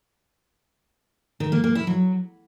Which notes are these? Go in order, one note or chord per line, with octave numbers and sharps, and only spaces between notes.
D#3
A#3
A#3
E4
F#3